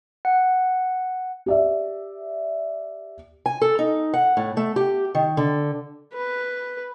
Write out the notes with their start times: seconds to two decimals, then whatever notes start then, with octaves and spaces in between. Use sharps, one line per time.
0.25 F#5
1.46 G4 D5 E5
3.46 G#5
3.62 A4
3.79 D#4
4.14 F#5
4.37 A2
4.57 A3
4.76 G4
5.15 D#3
5.37 D3
6.14 B4